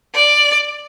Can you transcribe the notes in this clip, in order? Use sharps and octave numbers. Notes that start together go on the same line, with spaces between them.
D5